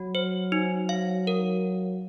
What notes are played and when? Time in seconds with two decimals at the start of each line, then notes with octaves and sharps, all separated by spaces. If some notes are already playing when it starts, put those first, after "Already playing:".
Already playing: F#3 F#4
0.15 C5
0.52 D#4
0.89 F5
1.27 A#4